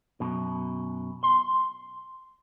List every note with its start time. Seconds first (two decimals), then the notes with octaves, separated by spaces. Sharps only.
0.20 F#2 B2
1.23 C6